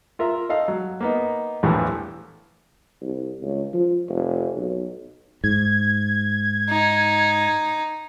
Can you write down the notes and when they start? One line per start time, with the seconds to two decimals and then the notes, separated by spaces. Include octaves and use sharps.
0.19 F4 A#4 E5
0.49 D#4 A4 D#5 F5
0.68 F#3
1.01 A#3 B3 D#4
1.63 A#1 E2 A2 E3 G3
3.01 C2
3.42 C#2
3.73 F3
4.09 F1
4.56 B1
5.44 G#2 G#6
6.70 D#4